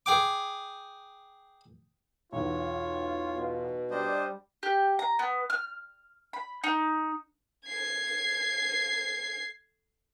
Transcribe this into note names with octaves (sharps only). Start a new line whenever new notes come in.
G#4 G5 D6
B1 E2 F4 C#5
B2
G3 D4 C5 D#5
G4
A#5
B3
F6
B5
D#4
G#6 C7